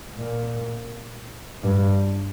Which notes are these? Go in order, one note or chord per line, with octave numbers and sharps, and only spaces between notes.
A#2
G2